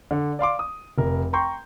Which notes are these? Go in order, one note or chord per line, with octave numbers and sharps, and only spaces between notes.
D3
D5 F5 C6 D6
D#6
F1 A#4
G5 A#5 C6 C#6 G6